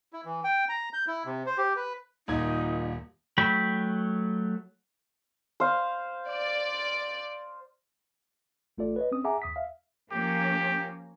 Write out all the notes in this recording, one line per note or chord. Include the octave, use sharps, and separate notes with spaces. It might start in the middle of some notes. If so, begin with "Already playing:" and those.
E4
E3
G5
A#5
G6
E4
C3
C5
G4
B4
D#1 A#2 D#4 G#6
F#3 A3 G5 B5
C5 F5
D5
A1 A3 F4 A4 D5
B4 C#5 D#5
C4 C#4 D#6
G#4 E5 F#5 G#5 A#5 D6
D#2 D#6 B6
E5 F5
F3 A#3 C#4 G4